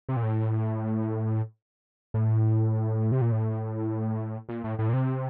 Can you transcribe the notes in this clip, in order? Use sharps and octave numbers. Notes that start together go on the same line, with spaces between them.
C3
A#2
A2
A2
C3
A#2
A2
A#2
A2
A2
A#2
C3